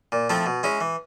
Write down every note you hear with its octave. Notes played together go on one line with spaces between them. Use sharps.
A#2
F3 A3 C4 E4
B2
G#3 C#4 E4
E3